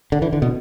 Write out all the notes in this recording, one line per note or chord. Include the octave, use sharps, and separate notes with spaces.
D3
E3
D3
B2